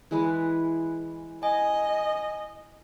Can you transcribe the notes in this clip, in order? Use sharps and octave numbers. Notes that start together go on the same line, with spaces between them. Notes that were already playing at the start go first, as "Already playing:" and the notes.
E3 G#3 B4
D#5 G#5